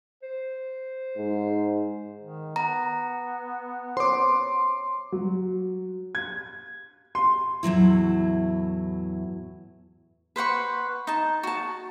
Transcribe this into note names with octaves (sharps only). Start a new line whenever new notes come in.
C5
G#2
D#3
B3 A#5
C5 C#5 C6 D6
F#3
G#6
C6
E2 A2 F#3 E4
B4 C5 F#5 C#6
D#4 A5
F#4 A5